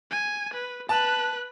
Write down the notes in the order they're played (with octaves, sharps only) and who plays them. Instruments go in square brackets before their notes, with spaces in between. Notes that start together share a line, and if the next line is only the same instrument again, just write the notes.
[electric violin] G#5
B4
[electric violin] B4 F#6 [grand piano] A5